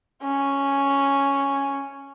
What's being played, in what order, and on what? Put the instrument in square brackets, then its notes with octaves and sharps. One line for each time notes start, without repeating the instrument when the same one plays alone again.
[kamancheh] C#4